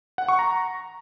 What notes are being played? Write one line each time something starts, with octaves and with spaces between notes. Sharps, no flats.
F#5
C#6
A#5